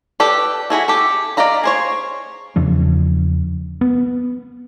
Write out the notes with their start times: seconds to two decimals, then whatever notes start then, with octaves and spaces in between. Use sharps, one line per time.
0.20 G4 A4 B4 D5
0.70 E4 F#4 G#4 A4
0.88 G4 A4
1.37 D5 D#5 F5 A#5 B5
1.64 G#4 C5 C#5
2.56 E2 C#3 F3 D4
3.81 B3